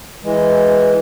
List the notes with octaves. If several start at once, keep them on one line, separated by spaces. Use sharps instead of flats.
E3 G#3